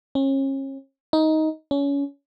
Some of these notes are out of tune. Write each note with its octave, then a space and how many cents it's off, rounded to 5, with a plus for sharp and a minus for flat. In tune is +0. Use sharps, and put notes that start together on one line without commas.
C#4 -35
D#4 +15
C#4 +25